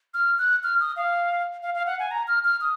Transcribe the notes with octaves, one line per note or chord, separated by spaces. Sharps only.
F6
F#6
F6
D#6
F5
F5
F5
F#5
G#5
A#5
F6
F6
D#6